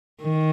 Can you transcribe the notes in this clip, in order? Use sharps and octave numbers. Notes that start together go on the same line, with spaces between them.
D#3